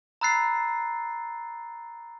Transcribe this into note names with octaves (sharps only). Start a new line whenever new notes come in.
A#5 B5 E6 F#6 A6 C7